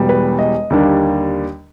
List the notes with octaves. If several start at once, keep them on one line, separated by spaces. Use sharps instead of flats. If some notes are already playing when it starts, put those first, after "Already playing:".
Already playing: E1 E2 B2 G3
B4
D#5
D#2 D3 G3 A#3 D4